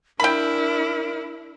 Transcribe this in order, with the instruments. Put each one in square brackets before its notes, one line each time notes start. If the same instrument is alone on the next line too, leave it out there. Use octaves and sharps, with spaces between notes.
[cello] D4 E4 [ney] A#4 [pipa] G5 B5